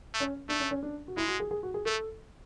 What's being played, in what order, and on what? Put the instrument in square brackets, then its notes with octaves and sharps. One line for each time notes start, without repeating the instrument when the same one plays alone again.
[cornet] A3
[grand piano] C#4
[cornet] A3 [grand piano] D4
[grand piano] C#4
C#4
D4
F#4
[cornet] G#3 [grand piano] E4
[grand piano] F#4
G#4
G#4
F#4
G#4
[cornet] A3 [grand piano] A4